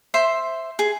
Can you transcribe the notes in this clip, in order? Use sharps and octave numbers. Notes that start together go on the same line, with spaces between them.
C5 E5 C6
G#4